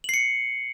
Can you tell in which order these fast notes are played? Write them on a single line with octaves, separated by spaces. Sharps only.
F#7 C7 C#7